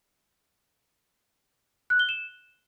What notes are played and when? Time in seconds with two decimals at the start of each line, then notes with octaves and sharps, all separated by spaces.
1.90 F#6
1.99 G7
2.09 E7